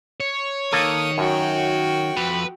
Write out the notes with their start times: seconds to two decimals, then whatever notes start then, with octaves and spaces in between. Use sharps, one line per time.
0.20 C#5
0.72 D#3 A#3 A4 D#6
1.18 F#2 F#4 G5
2.16 F2 B4